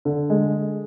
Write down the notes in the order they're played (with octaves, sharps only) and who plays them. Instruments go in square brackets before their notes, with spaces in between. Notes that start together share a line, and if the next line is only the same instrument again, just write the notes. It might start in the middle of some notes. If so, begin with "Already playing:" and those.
[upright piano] D3
G#3